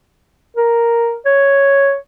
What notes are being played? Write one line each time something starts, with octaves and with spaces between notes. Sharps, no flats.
A#4
C#5